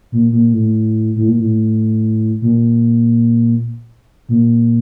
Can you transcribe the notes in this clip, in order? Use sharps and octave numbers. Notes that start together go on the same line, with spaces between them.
A#2
A#2
A2
A2
A#2
A2
A#2
A#2